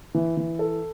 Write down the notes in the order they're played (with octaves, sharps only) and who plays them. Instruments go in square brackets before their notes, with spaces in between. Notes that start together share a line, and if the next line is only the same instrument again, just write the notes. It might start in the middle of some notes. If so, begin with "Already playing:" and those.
[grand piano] E3
E3
A4